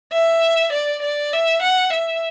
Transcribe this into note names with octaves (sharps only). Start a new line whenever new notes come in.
E5
D5
D5
E5
F#5
E5